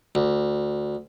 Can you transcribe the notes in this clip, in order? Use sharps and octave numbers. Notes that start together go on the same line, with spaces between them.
D2